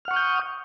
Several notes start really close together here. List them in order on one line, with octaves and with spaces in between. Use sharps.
F6 F#5 C#6 D#6 G6